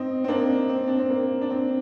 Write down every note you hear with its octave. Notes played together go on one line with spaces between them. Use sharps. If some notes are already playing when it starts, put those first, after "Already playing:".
Already playing: C4 D#4
C4
A#3 D4
C4
D4
C4
A#3
D4
C4